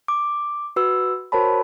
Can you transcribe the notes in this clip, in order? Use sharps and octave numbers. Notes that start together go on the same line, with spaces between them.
D6
F#4 B4 E6
F#4 A#4 C5 C#5 A5 B5